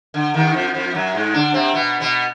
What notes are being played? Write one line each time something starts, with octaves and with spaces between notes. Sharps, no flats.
D3
D#2 D#3
F2 F3
F2 F3
F#2 F#3
G#2 G#3
D3 D4
C3 C4
B2 B3
B2 B3